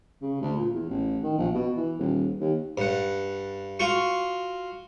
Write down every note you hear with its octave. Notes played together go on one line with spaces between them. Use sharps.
C#3
D2
A#2
E2
A1
D#3
A#1
B2
E3
D#1
D#2
G2 F#5
F4 F#4 C#6